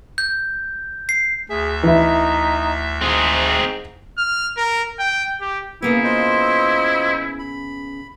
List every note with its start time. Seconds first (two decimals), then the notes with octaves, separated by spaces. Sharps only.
0.18 G6
1.09 C7
1.50 D2 G#4 E5
1.83 E3 D#4 E4
3.01 G#2 C4 G#4
4.18 F6
4.57 A#4
4.99 G5
5.41 G4
5.82 C#3 A#3 B3 E4
6.04 F4 C5 D#5
7.39 B5